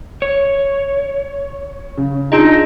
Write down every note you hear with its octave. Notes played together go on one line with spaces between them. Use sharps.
C#5
C#3
D4 D#4 F4 G#4 D#5